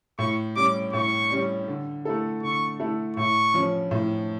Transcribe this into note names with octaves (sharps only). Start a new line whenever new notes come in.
A2 C#6
G3 C#4 D6
A2 C#6
G3 C#4
D3
A3 E4 A4
D3 C#6
A3 E4 A4
A2 C#6
F3 C#4
A2